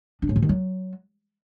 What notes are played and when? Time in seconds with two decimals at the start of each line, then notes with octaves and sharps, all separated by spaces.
0.22 D4
0.29 A2
0.36 E3
0.42 D#3
0.49 F#3